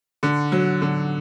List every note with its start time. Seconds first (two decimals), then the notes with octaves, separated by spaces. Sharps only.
0.23 D3
0.52 F#3
0.82 D3